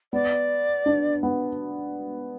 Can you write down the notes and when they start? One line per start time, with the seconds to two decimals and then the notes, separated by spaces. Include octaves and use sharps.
0.13 B3 D5
0.86 D4
1.23 B3